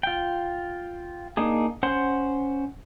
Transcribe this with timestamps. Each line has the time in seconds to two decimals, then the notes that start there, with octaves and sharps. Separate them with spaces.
0.03 F4 G5
1.37 A#3 D4 D#4 G#4
1.83 C#4 C5 F#5 C6